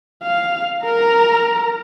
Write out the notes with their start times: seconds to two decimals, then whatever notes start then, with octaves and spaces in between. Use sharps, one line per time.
0.23 F5
0.82 A#4 A#5